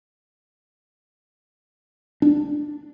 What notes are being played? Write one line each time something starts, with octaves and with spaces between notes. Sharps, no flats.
D4